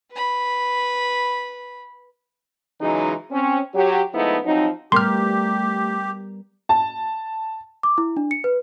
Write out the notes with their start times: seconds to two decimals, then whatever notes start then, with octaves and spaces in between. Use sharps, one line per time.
0.12 B4 B5
2.81 C#3 E3 F#3 G#3 D#4
3.31 C4 C#4
3.75 F#3 G4
4.14 F3 G#3 A3 B3 D#4 E4
4.45 F3 F#3 C4 D#4
4.92 G3 A3 B3 G4 A#4 C6 F6
6.69 A5
7.83 D6
7.98 E4
8.17 D4
8.31 C#7
8.44 B4